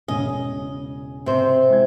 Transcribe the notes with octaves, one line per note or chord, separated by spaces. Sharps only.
E1 C#3 D#5 G#5
C3 C4 C5
G#3 E4 G#6